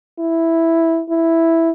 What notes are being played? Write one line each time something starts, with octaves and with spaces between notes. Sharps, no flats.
E4
E4